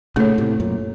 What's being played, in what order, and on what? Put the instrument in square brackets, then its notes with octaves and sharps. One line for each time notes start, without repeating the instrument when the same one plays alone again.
[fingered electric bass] A#2 C#3 [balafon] A3 D#4 A4 C#5
[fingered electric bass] A2 C3
F#2 A#2